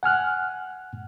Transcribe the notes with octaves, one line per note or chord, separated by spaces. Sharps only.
F#5 G#5 F6 F#6